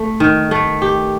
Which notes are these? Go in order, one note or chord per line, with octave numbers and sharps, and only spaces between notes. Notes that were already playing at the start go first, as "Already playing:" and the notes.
Already playing: A3
D#3
A3
G4